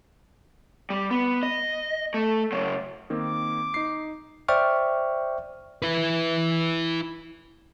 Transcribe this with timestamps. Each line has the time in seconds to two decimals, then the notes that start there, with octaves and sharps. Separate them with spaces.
0.90 G3
1.11 B3
1.43 D#5
2.14 A3
2.52 C#3 F#3
3.10 D#3 A#3 C4 D6
3.74 D#4 C7
4.48 C5 D5 E5 G5 C#6 F6
5.82 E4 B4